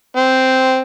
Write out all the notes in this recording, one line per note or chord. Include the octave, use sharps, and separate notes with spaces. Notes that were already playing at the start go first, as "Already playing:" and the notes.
C4